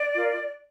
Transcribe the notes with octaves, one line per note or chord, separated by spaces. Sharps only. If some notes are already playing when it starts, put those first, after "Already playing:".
Already playing: D5
F4 A#4